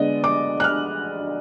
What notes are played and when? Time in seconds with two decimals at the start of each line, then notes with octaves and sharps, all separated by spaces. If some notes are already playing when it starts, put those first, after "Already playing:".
Already playing: D3 G#3 B3 D5 D#5
0.24 D6
0.60 F#6
0.64 F6